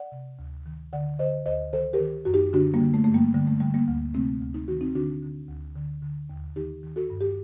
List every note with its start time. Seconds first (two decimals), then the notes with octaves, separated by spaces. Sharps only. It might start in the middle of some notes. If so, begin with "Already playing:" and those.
Already playing: D5 F#5
0.12 C3
0.39 D2
0.66 D#3
0.93 D3 D5 F#5
1.19 D3 C5 D#5
1.46 D2 C5 D#5
1.73 D#3 A4 C5
1.93 G4 A#4
2.00 D#3
2.25 F#2 F#4
2.34 D#4 G4
2.53 D3 D4 F#4
2.74 G3 A#3
2.80 D3
2.94 A3
3.04 G2 A3
3.14 G3 A#3
3.34 D3 G3
3.47 A3
3.60 D3 G3
3.74 G3 A#3
3.88 D2
4.14 C3 A3 C4
4.41 D2
4.54 D#4
4.68 D#3 F#4
4.81 C4 D#4
4.95 D3 D4 F#4
5.22 D3
5.48 D2
5.76 D3
6.02 D3
6.30 D#2
6.56 D#3 D#4 G4
6.83 D#3
6.96 F#4 A4
7.10 G2
7.21 G4